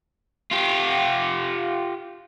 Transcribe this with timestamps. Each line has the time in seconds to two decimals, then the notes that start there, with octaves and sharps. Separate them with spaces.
0.52 F4 G4